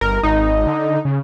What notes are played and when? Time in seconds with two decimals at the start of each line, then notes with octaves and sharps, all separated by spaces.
0.01 G1 A#4
0.23 G#1 D#4
0.67 D3
1.05 C#3